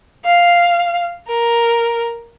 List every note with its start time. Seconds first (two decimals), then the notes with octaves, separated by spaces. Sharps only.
0.25 F5
1.28 A#4